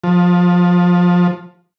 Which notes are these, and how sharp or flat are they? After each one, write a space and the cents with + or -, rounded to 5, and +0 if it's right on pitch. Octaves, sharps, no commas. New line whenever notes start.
F3 +20